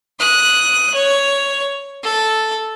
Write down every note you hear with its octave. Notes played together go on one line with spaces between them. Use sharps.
D#6 F#6
C#5
A4